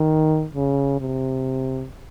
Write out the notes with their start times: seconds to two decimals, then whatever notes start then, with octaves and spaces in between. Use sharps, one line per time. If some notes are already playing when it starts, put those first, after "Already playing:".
Already playing: D#3
0.55 C#3
1.01 C3